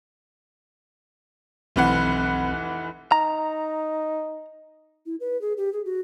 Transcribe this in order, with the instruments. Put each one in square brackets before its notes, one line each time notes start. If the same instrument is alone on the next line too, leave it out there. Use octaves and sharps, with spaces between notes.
[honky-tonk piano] F1 E3 F#5 [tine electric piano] B1 C4 B5
[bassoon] D#4 [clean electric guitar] A#5
[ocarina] E4
B4
G#4
G4
G#4
F#4